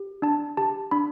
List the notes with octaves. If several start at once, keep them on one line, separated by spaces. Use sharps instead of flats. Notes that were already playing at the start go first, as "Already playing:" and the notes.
Already playing: G4
D4 A5
G4 A5
D4 B5